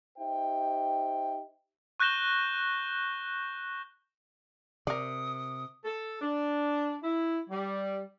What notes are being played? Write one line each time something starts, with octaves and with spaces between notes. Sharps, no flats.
D#4 G4 C5 E5 G5
C#6 F#6 G6 A#6 E7 G7
C3 A#4 D5 D#6
A4
D4
E4
G3